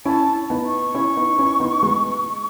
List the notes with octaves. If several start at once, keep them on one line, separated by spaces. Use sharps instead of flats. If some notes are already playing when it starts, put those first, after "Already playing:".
C#4 E4 A5
B3 D#4
C#6
C#4 E4
B3 D#4
C#4 E4
B3 D#4
G#3 B3